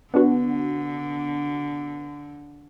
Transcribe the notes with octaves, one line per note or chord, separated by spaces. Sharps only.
D3 B3 D4 F#4